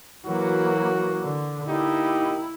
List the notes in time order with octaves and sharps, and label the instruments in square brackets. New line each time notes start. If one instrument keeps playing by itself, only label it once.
[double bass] E3 A#3 [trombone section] F#3 F#4
[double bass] D3
[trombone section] A#3 D#4 G4 [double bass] E4